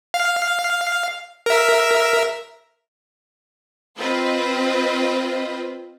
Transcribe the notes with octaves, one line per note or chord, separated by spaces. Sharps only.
F5
A#4 E5
C4 F4 B4 C5 D#5 B5